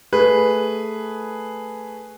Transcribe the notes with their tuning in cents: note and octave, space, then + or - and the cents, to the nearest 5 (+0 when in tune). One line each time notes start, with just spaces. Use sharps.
A3 +5 G#4 +0 B4 +0